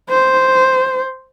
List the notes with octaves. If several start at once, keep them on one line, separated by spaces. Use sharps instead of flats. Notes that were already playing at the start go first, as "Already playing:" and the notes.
C5